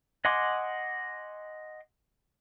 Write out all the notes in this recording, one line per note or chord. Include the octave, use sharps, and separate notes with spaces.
D#5 F#5 G#5 C6 D6